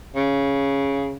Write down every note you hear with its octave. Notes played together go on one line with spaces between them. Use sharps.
C#3